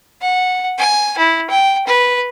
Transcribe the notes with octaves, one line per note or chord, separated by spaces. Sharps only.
F#5
G#5
E4
G5
B4